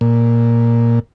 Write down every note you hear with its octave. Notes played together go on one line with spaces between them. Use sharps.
A#2